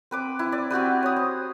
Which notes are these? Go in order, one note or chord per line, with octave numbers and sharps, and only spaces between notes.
C4 B4 D6
E4
D5
C4 F#4 G4 B4
C#5 D#6
C5